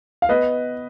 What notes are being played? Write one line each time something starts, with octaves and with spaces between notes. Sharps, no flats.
F5
B3 B4 D#5